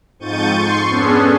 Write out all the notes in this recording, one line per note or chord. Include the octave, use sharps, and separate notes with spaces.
F2 G#2 C#6 G6 A6 D#7
C6 C#6 C7
B3 C#4 D4 G#4 A4